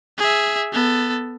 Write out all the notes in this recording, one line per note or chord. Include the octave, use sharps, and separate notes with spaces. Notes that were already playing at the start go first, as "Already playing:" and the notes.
G#4 E5
B3 A4